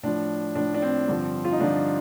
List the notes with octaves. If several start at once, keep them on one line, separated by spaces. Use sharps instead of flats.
A2 F3 D4
A2 F3 D4
D4
C4
G2 D3 F3
F4
D#4
G2 D3 F3 D4